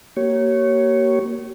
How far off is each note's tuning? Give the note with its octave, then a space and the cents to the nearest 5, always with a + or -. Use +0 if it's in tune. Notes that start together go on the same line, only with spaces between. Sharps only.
A#3 +0 G4 -40 C#5 +0